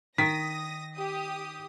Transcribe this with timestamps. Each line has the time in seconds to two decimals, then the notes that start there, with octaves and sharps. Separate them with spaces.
0.18 D#3 D#6 A#6 B6
0.95 G4 D#6